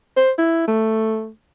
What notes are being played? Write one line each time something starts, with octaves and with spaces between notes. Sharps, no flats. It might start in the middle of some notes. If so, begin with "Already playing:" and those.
C5
E4
A3